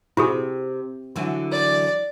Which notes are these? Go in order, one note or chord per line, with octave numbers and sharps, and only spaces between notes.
C3 E4 F#4 G#4
D3 E3 F#3
D5